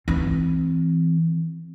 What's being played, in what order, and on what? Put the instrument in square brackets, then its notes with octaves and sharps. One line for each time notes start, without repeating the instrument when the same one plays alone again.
[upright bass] E3 C4